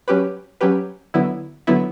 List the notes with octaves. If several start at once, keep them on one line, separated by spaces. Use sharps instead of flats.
F#3 C#4 G4 B4
F#3 C#4 G4 B4
D3 F#3 B3 E4
D3 F#3 B3 E4